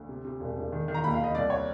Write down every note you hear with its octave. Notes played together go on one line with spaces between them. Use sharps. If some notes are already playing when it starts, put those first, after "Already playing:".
Already playing: D2
C3
C3
E1
E1
D#3
D#3
A#5
D#2 B5
F5
D#2 D#5
C2 D5
C#5